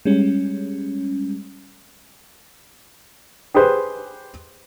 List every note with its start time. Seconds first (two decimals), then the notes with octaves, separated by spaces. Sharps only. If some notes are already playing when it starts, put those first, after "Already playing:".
0.05 G3 G#3 C#4
3.54 G4 G#4 B4 C5